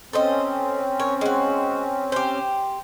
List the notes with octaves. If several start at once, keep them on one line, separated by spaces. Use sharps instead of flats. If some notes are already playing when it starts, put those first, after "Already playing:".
C4 C#4 A4 C5 D#5
A#4 C#5
G#3 F#4
G4 C5